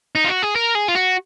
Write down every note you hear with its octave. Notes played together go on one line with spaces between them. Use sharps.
D#4
F4
F#4
G#4
A#4
G#4
F4
F#4